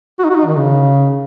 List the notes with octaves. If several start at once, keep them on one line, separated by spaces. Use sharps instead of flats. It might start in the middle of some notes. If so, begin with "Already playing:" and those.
F#4
D#4
F#4
D#4
D#3
C#3